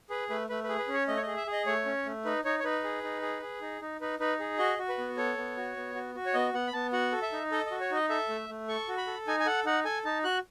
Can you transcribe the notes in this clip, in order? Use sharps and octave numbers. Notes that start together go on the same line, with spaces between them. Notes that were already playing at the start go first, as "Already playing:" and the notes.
G#4 B4
A3 B4
A3 B4
G#4 B4
B4
C#4
C#5
A3 D#5
C#5
G#4 D#5
E5
G#4
D#5
A3 C#5
C#4
A3
D#4 B4
D#4 C#5
C#5
D#4 B4
G#4
D#4
G#4
G#4
D#4
D#4
D#4 B4
D#4 B4
G#4
F#4 D#5
F#4
B4
B3
A4 C#5
B3
F#4
B3
F#4
F#4
C#5
B3 D#5
B3 F#5
B5
B3 A5
F#4 F#5
A4
E5
D#4
A4 D#5
D#5
F#4
C#5
D#4 D#5
A4 E5
A3
A3
A4 C#6
F#4
B5
A4
D#4 G#5
G#5
A4 F#5
D#4 F#5
A4 G#5
D#4 A5
F#4 F#6